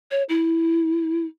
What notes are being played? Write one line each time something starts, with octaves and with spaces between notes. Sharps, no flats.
C#5
E4